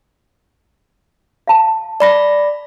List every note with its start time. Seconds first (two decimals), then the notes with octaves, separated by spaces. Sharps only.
1.47 F5 A5
2.00 D5 B5 A#6